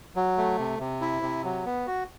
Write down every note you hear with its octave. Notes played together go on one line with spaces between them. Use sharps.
F#3
A3
C3
C3
E4
C3
F#3
B3
F#4